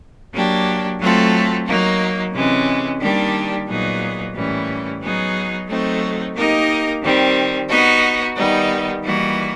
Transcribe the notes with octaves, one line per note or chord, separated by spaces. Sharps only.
F#3 A#3 D4 G4
F#3 A3 C4 F4 A4
F#3 A#3 D#4
C3 E3 G#3 C#4
D#3 G3 A#3 D4 G4
A#2 F#3 B3 D#4 G#4
A2 E3 G3 A#3 C#4
F#3 B3 D#4 G#4
F#3 A3 C4 D#4
A#3 D#4 G4 A#4 D#5
D#3 G3 C4
B3 D#4 F#4
D#3 G3 B3 D#4
E3 G3 A#3 D#4 F#4